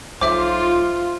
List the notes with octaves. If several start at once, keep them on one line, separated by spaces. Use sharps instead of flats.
B1 F4 C5 E5 D6